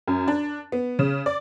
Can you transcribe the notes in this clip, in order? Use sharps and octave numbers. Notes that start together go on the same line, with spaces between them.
F#2
D4
B3
C#3
D5